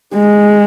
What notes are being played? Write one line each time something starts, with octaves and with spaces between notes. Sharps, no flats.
G#3